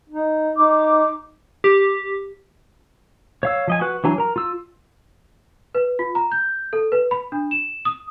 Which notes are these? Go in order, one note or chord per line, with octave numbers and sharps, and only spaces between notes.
D#4
D#4 D6
G4
C#5 F5 E6
F3 D#5 G#5
F#4 B4 F#6
E3 F#3 D4 G#5 A#5
A#4 A#5
F4 E6
B4
F4
A#5
G6
A4
B4
B5
D4
E7
D#6